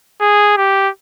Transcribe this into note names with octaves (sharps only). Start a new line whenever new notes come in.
G#4
G4